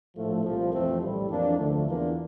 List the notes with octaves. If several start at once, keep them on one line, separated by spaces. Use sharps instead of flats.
A#1 A2 F3 A3
C2 A#2 F3
F2 E3 A3 C4
A#1 A2 G3
F2 E3 A#3 D4
D2 D3 F3 A3
E2 E3 A#3 D4 F4